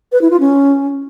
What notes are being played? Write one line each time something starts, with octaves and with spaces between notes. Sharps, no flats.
B4
E4
F4
C#4